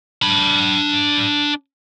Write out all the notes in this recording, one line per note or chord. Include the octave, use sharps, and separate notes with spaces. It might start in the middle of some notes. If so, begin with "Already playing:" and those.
D4 B5